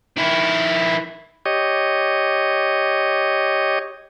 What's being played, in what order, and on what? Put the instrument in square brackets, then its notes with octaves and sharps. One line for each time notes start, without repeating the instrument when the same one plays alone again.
[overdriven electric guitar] D#3 E4
[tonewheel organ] G4 C#5 D#5